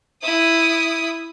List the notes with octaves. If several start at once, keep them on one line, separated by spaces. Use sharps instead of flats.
E4 D#6